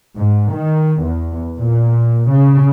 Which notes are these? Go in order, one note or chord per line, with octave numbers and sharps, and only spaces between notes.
G#2
D#3
E2
A#2
C#3